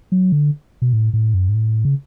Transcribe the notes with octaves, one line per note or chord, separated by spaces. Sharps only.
F#3
D3
B2
A2
A2
F#2
G#2
A2
C#3